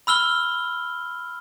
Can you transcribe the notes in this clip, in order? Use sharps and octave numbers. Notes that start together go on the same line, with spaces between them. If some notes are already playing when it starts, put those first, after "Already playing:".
B5 E6 F6 G7